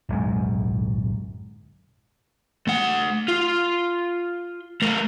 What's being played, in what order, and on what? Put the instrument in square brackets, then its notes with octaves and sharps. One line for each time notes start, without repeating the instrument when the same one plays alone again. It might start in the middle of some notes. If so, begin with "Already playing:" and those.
[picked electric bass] D1 B1 F#2 G#3
[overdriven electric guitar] A3 F#5
F4
A3 A#4